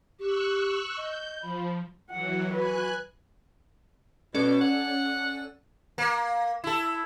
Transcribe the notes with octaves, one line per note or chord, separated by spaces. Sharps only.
G4 C#6 E6 F#6
D#5 G6
F3 B5
E3 F#3 F#5
F#4 B4 G#5 F#6
B2 C#4 A4 D5
F#5
A#3
E4 A4